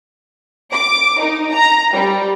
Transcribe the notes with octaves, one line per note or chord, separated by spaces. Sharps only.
D6
D#4
A#5
G3